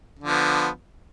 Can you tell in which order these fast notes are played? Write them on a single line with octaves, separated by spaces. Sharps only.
D3 F3 B3